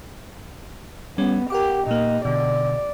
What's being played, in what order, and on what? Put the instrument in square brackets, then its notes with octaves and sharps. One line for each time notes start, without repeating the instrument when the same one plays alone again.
[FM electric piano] G3 C#4 [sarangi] B3
[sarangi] G4 [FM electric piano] A#4 F#5 D6
[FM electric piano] A#2 A#3 [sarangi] D#4
[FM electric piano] B2 D3 [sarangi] D5